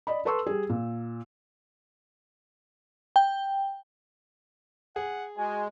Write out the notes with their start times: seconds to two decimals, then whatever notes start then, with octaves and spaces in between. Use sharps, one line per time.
0.07 D5 D#5 B5
0.25 A4 B4 A5 C6 C#6 E6
0.47 G3 G#4
0.70 A#2
3.16 G5
4.96 G#4 F#5
5.38 G#3 F#4 G#5